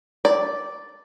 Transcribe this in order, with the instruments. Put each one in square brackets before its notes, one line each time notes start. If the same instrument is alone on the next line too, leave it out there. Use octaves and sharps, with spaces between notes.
[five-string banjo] D5